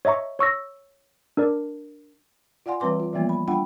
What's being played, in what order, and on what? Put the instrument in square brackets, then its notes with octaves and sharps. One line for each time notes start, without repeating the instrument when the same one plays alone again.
[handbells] C#5 D#5 E5 A#5 C#6
C#5 C#6 E6 A#6
D4 A#4 D5
[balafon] F4 D5 F5 F#5 G#5 C6
E3 G3 C4 B4 C6 D6
F4
E3 F3 G3 A#3 B3 F4
B5
G3 D4 F4 F#5 G5 B5